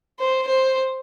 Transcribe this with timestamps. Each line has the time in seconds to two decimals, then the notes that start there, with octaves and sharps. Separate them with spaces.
0.20 C5
0.48 C5